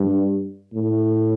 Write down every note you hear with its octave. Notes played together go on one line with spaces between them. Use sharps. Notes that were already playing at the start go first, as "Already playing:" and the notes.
Already playing: G2
A2